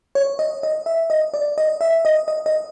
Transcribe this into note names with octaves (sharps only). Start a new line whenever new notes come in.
C#5
D#5
D#5
E5
D#5
D5
D#5
E5
D#5
D#5
D#5